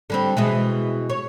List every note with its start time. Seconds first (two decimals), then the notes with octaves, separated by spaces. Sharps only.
0.10 D3 G3 C4
0.37 B2 E3 G#3
1.10 C#5